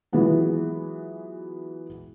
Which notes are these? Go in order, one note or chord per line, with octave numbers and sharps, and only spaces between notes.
E3 F#3 G#3 B3 F4